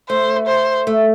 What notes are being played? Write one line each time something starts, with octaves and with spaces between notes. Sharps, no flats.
A3 C5
C5
A3